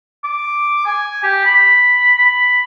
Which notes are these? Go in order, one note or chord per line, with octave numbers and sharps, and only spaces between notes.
D6
G#5
G4
B5
B5